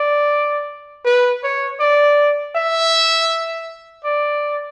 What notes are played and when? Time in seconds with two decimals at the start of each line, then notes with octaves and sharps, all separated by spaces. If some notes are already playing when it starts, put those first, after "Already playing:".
Already playing: D5
1.05 B4
1.43 C#5
1.80 D5
2.55 E5
4.04 D5